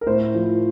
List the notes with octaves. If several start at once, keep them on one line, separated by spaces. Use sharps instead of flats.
A#4
A2 C5
F3